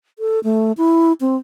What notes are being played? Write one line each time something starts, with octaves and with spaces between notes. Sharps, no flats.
A4
A3
E4
C4